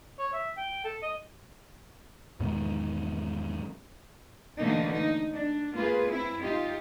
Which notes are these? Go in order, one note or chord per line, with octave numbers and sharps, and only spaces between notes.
C#5
E5
G5
A4
D#5
E2 G#2 B2 D#3
B2 D3 E3 A3 A#3 D#4
D#4
D4
A#3 F4 G#4 B4
C4 E4
D#4 F4 G4